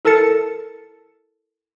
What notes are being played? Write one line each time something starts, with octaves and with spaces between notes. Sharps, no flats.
E4 A4 A#4 A5 A6 C#7